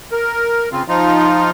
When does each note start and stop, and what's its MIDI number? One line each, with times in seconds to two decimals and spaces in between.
0.12 0.69 70
0.72 0.83 49
0.72 0.83 60
0.72 0.83 65
0.88 1.50 53
0.88 1.50 63
0.88 1.50 65